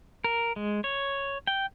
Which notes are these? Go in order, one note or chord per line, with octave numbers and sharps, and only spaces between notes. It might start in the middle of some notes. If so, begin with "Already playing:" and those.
A#4
G#3
C#5
G5